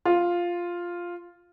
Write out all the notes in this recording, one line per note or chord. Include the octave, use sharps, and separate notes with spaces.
F4